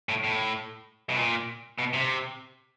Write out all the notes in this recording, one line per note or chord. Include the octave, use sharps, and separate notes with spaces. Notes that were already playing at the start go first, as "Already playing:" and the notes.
A2
A2
B2
A#2
B2
C3